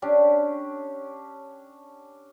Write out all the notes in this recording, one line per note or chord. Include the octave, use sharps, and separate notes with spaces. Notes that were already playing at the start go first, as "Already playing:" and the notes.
C#4 D4 G4